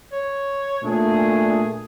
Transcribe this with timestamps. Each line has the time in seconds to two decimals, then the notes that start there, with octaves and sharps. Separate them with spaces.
0.12 C#5
0.84 A#2 A3 D4 G#4